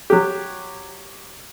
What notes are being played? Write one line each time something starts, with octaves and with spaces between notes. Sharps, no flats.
F#3 G4